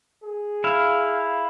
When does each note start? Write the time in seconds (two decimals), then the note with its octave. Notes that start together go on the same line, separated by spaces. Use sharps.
0.24 G#4
0.64 E4 F5